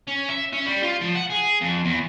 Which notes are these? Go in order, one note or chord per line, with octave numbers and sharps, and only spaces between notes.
C#4
E5
C#4
G3
F4
F3
F#5
G#4
F2
E2